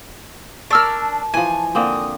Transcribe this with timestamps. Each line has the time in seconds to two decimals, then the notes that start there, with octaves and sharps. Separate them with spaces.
0.70 D4 A#4 C#5 A5 E6 F6
1.34 E3 F3 G#5
1.75 D3 A#3 C4 D#6